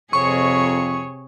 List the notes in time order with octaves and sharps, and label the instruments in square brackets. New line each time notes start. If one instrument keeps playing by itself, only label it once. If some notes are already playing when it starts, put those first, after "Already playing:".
[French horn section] F2 [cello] C3 G#4 [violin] C#5 C#7 [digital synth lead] C#6